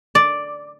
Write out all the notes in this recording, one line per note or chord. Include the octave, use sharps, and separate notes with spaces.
D5